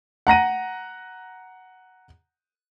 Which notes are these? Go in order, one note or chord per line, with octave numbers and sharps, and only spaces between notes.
F#5 A#5 A#6 D#7